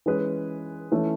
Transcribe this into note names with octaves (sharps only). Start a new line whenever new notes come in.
E3 G#3 C#4 G#4 B4
E3 A3 C#4 E4